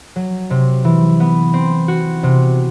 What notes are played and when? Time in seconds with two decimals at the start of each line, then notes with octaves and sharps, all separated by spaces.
0.16 F#3
0.50 C3
0.84 E3
1.20 B3
1.53 C4
1.88 F#4
2.23 C3